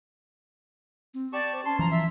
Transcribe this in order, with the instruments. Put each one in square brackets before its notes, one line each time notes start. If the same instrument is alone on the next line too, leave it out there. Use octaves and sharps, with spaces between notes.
[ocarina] C4
[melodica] G4 A5 C#6 [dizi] D5
[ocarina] C5
[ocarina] C#4 [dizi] A5 [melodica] C6
[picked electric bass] E3 F3 [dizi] A#5
[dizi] E5